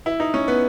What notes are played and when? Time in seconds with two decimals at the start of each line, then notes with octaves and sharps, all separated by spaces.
0.06 E4
0.20 D#4
0.34 C#4
0.48 B3